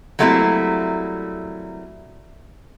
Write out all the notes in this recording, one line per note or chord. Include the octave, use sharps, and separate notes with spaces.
F#3 G3 A3 A#3 C4 E4